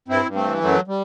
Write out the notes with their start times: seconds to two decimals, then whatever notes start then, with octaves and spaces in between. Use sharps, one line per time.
0.08 G2 C4 E4
0.26 G2
0.35 A3 C4
0.44 E3
0.61 F#2 F#3 A3
0.87 G3